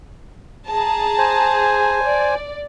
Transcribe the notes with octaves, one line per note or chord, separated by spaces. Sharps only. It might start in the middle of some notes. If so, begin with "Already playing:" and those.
G#4 A5 A#5
C5 G#5
D5